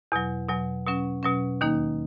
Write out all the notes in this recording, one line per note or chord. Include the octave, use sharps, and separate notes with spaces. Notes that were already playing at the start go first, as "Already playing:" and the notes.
E2 B2 F#3
E2 B2 F#3
B2 F#3 C#4
B2 F#3 C#4
D#2 D#3 A#3 D#4